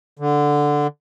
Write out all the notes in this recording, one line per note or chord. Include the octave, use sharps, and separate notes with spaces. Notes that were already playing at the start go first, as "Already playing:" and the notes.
D3